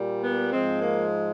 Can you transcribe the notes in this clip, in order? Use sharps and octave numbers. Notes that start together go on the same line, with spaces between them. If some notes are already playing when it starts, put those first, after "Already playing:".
Already playing: A#2 G3
B3
G#2 F3 G#3 C4
A#3